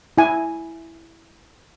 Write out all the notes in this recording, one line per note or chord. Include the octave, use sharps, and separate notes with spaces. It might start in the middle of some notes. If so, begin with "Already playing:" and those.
E4 G#5